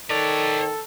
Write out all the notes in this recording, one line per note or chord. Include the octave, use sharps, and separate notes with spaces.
D#3 A4 B4 C#5 D5